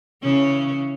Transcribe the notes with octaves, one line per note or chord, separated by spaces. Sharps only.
C#3 E3 C#4